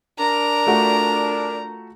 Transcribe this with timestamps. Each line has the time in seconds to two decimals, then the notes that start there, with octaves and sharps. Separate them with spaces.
0.19 D4 A#4 A#5
0.67 A3 F4 F#4